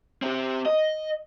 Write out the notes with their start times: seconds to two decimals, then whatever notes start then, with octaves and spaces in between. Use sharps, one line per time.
0.22 C4 G4
0.66 D#5